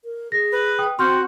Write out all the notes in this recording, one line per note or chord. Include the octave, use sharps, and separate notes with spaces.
A#4
G#4 A#6
B4
G5 D#6
C4 F#4 C6 F6 G6